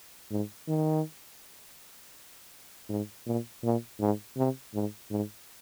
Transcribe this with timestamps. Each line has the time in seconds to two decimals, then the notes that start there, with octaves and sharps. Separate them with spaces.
0.30 G#2
0.68 D#3
2.89 G#2
3.26 A#2
3.63 A#2
3.99 G#2
4.37 C3
4.74 G#2
5.10 G#2